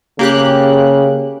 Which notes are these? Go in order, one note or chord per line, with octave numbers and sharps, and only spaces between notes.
C#3 A#3 G4 F#6